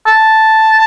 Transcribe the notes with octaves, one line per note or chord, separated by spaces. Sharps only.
A5